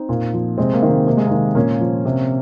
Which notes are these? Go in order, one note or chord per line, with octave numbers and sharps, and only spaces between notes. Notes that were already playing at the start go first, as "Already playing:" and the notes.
Already playing: C4 D#4
A#2
F3
C3 G#3 C4
A#3
D#3
G#3
C3 A#3
G#3
D#3 A#3
A#2 A#3 C#4
F3
C3